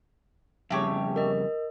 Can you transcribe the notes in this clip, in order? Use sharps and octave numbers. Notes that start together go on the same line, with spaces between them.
F2 C#3 G3 A3 G4 C#5
A#4 D#5